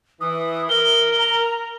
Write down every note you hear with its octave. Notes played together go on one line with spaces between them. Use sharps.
E3 D#6
A#4 G7
A#5